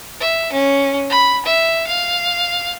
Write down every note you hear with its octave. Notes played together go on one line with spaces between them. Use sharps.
E5
C#4
B5
E5
F5